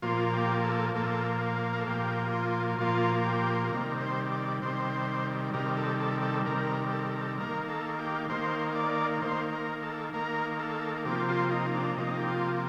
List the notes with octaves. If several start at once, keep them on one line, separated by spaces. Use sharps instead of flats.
A#2 F3 A#3 F4
G4
A4
A#2 F3 A#3 A4
A#4
A4
A#2 F3 A#3 G4
F4
A#2 F3 A#3 F4
G4
C3 D#3 G3 A#4
C5
D5
C3 D#3 G3 C5
C3 D#3 G3 A#4
A4
A4
A4
C3 D#3 G3 A#4
A4
A#4
A4
A#4
A4
D#3 A#3 A#4
A4
G4
D#3 A#3 C5
D5
D#3 A#3 C5
A#4
A4
D#3 A#3 A#4
A4
C3 F3 A#3 G4
F4
D#4
D4
C3 F3 A#3 D#4
G4
F4